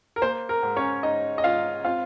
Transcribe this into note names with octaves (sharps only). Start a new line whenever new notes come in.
A#4
A#3 C5
A#4
G#2
C#4 C#5
G#2 D#4 D#5
D#5
G#2 F4 F5
C4 F4 F5